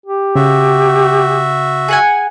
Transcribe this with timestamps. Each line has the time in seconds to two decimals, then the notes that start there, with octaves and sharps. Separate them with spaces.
0.06 G4
0.36 C#3 F#4 E5
1.88 G#4 F#5 G#5